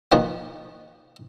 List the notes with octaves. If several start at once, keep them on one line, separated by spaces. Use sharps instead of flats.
B2 D#3 F3 A#3 B3